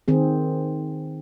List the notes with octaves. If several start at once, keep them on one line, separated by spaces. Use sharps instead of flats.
D#3 C4 G#4